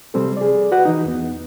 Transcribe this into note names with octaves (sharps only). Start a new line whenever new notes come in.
C3 G3 C4 A4
G#4 D5
F#4 B4 F#5
E3 D#4
E2 B3